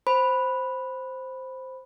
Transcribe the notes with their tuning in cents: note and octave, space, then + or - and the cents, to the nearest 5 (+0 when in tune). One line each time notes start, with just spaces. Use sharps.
C5 +0 B5 +0